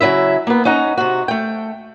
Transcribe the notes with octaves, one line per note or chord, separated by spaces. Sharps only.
C#3 F#3 E4 E5
A#3 B3
C#4 D#4 F#5 A#5
C3 F#4
A3 G5